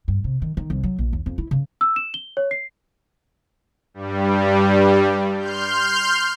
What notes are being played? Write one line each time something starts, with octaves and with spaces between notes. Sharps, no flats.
G2
C3
D#3
D#3
C2
F#3
A#1
D#2
F2
E4
C#3
E6
E7
G7
C#5
C7
G2 G3
C6 F6 G6